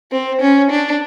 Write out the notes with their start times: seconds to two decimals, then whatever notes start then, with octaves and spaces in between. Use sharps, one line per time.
0.12 C4
0.41 C#4
0.71 D4